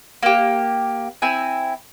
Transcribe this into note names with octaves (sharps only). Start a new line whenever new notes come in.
A#3 G4
C4 E4 G#5